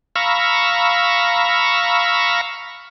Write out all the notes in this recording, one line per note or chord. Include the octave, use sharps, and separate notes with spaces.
F5 A#5 B5 C#6 E6